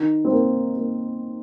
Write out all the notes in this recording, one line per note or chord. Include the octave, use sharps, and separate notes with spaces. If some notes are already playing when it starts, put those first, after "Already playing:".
Already playing: D#3
C4
A#3
A#3